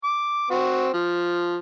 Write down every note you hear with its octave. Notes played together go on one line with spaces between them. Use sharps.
D6
C4 F#4
F3